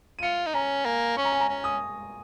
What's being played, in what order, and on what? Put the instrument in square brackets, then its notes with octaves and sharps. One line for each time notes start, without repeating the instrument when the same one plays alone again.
[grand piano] D#7
[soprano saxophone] F4 [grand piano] C#7
[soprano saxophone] D#4
[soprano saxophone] C#4 [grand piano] A#5
[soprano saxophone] A#3 [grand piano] G#5
[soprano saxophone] C#4 [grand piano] C#6
[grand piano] A#5
G#5
A#5
[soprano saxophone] C#4
[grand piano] D#6